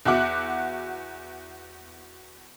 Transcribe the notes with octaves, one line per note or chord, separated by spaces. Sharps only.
E2 F#4 E5 F#5 D6 F#6